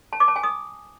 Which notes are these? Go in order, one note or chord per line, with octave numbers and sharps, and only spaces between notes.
A5
D6
A5
G#5
D#6